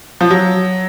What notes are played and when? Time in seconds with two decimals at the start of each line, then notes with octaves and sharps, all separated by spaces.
0.21 F3
0.31 F#3